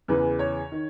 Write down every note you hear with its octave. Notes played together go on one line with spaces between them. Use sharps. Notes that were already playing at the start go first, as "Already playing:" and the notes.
E2 C#3 E3 B4
C#5
D#3